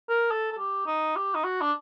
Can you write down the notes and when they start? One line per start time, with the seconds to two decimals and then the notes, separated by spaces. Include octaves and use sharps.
0.09 A#4
0.31 A4
0.52 A4
0.58 G4
0.87 D#4
1.16 G4
1.35 D#4
1.44 F#4
1.61 D4